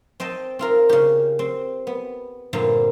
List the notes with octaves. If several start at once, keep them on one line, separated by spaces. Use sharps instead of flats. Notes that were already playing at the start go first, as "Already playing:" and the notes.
C4 D#5 G5 A5
C4 F4 A#4
C#3 G4
C4
B3
G2 A#2 D3 G3 C4